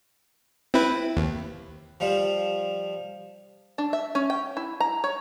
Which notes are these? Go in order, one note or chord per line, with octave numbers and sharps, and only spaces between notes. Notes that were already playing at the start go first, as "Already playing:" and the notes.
C4 E4 B4
D#2
F3 G3
D4
E5
C#4
G5
E4
A#5
C#5